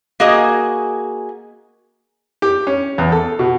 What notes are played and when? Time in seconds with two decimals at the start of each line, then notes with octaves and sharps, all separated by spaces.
0.20 A#3 F#4 G#4 D#5
2.42 G4
2.67 C#4
2.98 E2
3.12 A4
3.39 B2